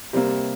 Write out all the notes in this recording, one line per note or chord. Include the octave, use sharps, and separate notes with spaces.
C3 G3 A#3